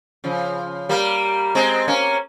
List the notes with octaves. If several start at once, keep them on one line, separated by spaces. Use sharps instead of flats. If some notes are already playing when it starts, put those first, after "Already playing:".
C#3 F3
G3 A#3
G#3 C4
A#3 C#4